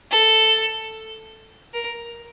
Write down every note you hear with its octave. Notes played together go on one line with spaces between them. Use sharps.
A4
A#4